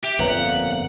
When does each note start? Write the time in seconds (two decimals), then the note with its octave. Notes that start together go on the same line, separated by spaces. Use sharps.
0.04 G4 E5
0.19 G1 F2 A#2 B4 C#5 E5 F#5 A#5
0.38 F5